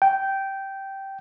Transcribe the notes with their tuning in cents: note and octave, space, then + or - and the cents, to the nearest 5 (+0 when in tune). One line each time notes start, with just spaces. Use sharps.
G5 -10